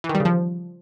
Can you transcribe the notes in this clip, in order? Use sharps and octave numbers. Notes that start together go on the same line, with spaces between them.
E3
D#3
G3
C#3
F3